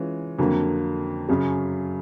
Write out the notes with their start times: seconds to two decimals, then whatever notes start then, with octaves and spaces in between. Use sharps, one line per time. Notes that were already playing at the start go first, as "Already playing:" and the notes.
Already playing: E3 G#3 C#4 F4
0.39 F2 D3 F#3 A#3
1.29 F#2 C#3 F#3